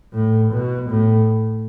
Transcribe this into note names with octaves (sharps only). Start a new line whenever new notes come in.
A2
B2
A2